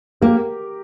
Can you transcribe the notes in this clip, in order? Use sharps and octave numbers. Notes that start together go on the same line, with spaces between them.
A#3 G4 A#4